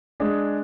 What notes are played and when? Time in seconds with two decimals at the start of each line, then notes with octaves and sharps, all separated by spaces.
0.20 G#3 D4 G#4